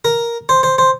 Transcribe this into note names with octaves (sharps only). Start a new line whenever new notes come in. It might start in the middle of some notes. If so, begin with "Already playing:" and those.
A#4
C5
C5
C5